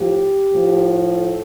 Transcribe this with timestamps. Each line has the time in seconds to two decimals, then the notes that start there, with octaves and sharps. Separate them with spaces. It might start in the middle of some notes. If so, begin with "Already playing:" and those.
Already playing: A2 F3 G4
0.51 A2 F3
1.12 A4